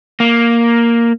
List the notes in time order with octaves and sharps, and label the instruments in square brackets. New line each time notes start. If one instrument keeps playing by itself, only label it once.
[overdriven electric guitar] A#3